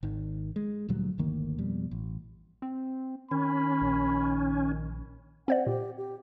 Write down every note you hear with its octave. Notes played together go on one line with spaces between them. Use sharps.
G#1 D#3
G#3
D2 A#2 F#3 G3
G1 D2 D#3 A#3
F2 B2 G3
A1
C4
D#3 C#4 B5
A#1
C4 C5 D5 F#5
A#2 G4
G4